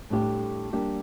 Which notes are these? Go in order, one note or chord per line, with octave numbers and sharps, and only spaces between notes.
A2 G3 D4 G4
G3 A#3 D4 G4